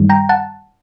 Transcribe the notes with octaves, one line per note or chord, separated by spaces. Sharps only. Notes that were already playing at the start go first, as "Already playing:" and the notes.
Already playing: G2 D#3 G3
G5 A#5
F#5 A5